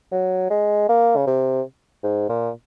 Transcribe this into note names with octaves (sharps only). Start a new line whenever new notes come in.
F#3
G#3
A#3
C#3
C3
G#2
A#2